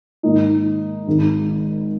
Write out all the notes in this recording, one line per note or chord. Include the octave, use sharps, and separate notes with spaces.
G#2 D#3 A#3 D#4
G#1 G#2 D#3 G#3